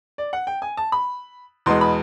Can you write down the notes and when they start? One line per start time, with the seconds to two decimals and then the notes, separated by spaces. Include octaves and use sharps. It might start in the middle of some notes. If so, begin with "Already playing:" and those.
0.18 D5
0.33 F#5
0.47 G5
0.62 G#5
0.77 A5
0.92 B5
1.66 E2 B2 G#3 C6
1.81 B5